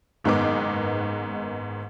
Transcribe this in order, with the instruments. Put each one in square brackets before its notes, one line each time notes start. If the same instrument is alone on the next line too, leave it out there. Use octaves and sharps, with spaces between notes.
[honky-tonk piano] F#1 G#2 D#3 G#3 B3 D6